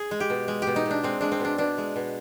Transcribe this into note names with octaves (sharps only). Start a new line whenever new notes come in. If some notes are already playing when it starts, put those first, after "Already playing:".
Already playing: G#4
G#3
G4
B2
G#3
B2 G4
D#4
B2 D4
G#3 C4
G#3 D4
C4
B2 D4
B2 D4
G#3
B2